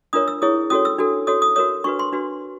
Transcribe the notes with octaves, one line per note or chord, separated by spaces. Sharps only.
D4 F4 A#4 C#5 D#6
E6
E4 G#4 C#5 D#6
C#4 F#4 A4 C#5 D#6
E6
D4 F#4 A4
F#4 A4 C#5 D#6
D#6
F#4 A#4 C#5 D#6
D4 F#4 B4 C#6
C6
D4 F#4 B4